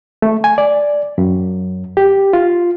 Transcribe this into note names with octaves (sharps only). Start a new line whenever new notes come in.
A3
G#5
D5
F#2
G4
F4